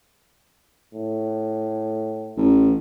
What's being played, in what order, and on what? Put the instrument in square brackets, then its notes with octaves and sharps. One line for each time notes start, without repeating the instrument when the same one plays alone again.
[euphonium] A2
[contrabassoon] A1